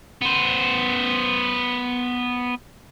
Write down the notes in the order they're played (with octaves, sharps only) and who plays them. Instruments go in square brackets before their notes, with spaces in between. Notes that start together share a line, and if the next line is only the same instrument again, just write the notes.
[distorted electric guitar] B3 C5